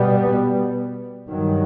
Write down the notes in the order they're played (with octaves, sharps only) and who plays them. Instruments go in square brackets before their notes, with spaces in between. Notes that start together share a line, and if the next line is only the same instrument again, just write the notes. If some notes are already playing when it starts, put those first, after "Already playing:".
Already playing: [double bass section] B2 G3 B3
G2 D#3 F#3